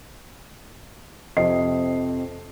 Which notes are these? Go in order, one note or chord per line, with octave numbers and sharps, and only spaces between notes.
F2 C3 D#5 C7